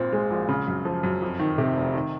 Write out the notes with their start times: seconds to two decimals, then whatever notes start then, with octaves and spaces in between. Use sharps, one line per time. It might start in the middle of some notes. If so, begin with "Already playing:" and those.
Already playing: G#1 A#2 C4
0.13 G#3
0.31 A#1
0.48 C#3
0.67 F#2
0.85 F3
1.03 F#2
1.22 F2
1.40 D#3
1.58 C3
1.77 F1
1.95 D#3